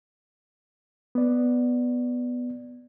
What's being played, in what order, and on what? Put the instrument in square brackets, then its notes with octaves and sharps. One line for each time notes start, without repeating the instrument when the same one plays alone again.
[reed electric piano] B3 D5